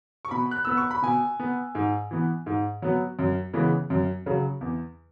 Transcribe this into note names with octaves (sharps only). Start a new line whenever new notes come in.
C#6
B2 B5
F#6
B3 E6
C#6
B5
B2 G#5
B3
G#2
E3 B3
G#2
F#3 B3
F#2
C#3 E3 G#3 B3
F#2
C#3 F#3
E2